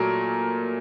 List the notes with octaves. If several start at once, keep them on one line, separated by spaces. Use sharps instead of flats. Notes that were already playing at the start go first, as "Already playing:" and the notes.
Already playing: A#2 F#3 A3 A#4